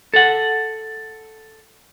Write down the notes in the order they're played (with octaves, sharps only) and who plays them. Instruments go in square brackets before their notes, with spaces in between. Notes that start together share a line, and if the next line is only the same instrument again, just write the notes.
[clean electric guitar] A4 F#5